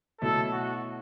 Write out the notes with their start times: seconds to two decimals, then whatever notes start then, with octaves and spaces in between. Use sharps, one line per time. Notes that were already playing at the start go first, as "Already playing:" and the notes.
0.21 B2 F#3 A3 E4 A4
0.52 F#4